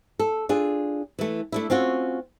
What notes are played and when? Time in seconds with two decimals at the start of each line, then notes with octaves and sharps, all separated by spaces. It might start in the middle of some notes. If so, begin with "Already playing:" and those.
0.19 A4
0.49 D4 F4 G#4
1.19 E3 A3
1.52 A3 D4 E4
1.70 C4 C#4 F4 F#4